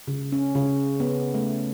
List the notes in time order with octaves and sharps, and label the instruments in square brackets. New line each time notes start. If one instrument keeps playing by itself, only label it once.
[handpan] C#3
C#4
C#3
B3
A3